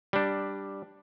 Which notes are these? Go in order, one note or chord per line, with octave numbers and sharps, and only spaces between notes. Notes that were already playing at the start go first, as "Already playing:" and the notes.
G3 D4